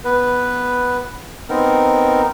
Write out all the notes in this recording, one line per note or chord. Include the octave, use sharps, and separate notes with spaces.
B3 B4
B3 C4 D#4 A#4